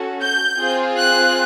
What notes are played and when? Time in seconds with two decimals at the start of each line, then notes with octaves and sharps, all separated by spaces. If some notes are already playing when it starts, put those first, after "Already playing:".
Already playing: C#4 F#4 A4
0.24 G6
0.59 C4 F4 G#4
0.94 F#6